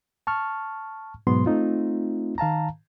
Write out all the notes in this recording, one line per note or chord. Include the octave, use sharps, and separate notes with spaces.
A5 C#6 F6
G#2 B2 F#3 B3 C6
A3 C4 D#4 F4
D#3 F5 A5 A#5